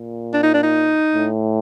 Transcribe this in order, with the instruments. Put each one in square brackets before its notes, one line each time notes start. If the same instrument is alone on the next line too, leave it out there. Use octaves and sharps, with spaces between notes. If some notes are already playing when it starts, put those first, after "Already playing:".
Already playing: [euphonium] A#2
[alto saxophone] D4
D#4
D4
D#4
[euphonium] A2